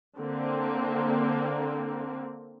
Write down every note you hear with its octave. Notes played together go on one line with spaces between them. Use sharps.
D3 A#3 C4